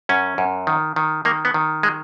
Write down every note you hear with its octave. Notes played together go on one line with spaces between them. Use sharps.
F#2 C#4
F#2
D#3
D#3
D#3 A#3
B3
D#3
G#3